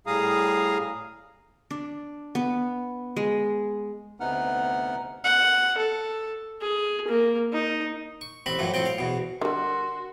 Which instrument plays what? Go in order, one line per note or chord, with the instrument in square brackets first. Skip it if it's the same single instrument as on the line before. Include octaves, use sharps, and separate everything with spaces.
[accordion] A2 G3 G#4 F5 A#5 D#6
[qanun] D4
B3
G#3
[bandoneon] D2 C3 B3 D#4 F#5 F6
[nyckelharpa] F#5
A4
G#4
A#3
D#4
[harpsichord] C#6
A1 C4 E5 B5
F#2 A2 E3 F3
A2 F3 C4 G5
F5
E2 B2
[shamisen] D3 G3 [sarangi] F#4 [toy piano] A#4 [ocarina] C6